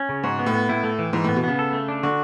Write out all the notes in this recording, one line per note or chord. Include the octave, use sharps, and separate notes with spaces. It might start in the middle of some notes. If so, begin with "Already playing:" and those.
Already playing: C#4
C#3
G#2 F#4
B3
A2
B3
A2 E4
A3
E3
G#2 E3
A2 B3
B2
C#3 B3
A4
A3
D4
D3 F#4